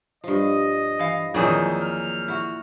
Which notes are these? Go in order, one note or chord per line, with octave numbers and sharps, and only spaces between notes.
G2 F3 D#5
E3 F5
F2 A#2 D#3 E3 F#3 G#4 C5 G#5
F6
E4 F#4